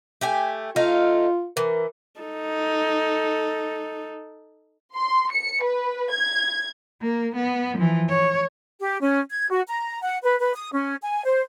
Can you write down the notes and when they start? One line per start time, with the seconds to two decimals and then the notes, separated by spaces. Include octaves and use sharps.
0.21 A3 G4 G#5
0.76 A3 D#4 F4 F5
1.57 E3 A#4
2.21 D#4 A4
4.95 C6
5.32 C#7
5.62 B4
6.12 G#6
7.02 A#3
7.35 B3
7.77 E3 F3
8.09 C#5
8.80 G4
9.01 C#4
9.30 G#6
9.50 F#4
9.68 A#5
10.02 F#5
10.23 B4
10.40 B4
10.55 D#6
10.72 C#4
11.02 G#5
11.25 C5